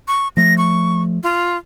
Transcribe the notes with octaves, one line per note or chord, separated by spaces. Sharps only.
C#6
F3 A3 A#6
C#6
F4